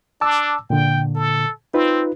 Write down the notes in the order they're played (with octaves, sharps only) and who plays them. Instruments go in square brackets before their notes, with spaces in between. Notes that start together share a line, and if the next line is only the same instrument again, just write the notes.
[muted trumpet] D4 [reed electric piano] A5 D6 E6
[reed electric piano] A#2 D3 [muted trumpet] G5
[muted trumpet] A4
[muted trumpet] C4 [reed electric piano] D#4 F4 B4